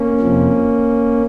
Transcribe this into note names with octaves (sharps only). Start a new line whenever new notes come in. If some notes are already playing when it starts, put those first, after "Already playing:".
Already playing: A#3 C#4
F2 C3 F3